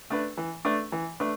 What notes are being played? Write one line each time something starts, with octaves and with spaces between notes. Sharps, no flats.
A3 D4 B4
E3
A3 D4 B4
E3
A3 D4 B4